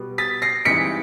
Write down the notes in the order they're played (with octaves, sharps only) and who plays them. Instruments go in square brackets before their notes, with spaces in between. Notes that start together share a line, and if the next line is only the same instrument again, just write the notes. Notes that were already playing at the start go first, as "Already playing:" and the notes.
Already playing: [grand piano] B2 G3 B3
A6 B6
A#6 C7
G2 E3 G#3 C4 D#4 B6 C#7